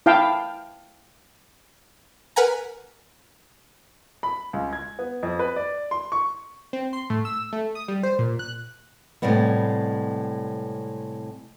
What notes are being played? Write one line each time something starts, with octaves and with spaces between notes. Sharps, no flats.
E4 F5 G5 A5
A#4 B4 F#5 G#5 A#5
B5
C#2
G#6
B3
F2
B4
D5
C6
C#6
C4
C6
A2
E6
A3
D#6
G3
C5
A#2
F#6
A2 C3 G3 G#3 B3